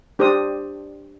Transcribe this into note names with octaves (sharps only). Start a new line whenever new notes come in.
D4 G4 C5 D5 D#6